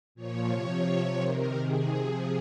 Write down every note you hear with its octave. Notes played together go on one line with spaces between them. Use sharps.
A#2 F3 C#5
C3 F3 C#5
C3 F3
C3 D#3 A#4
C3 D#3 G#4
C3 F3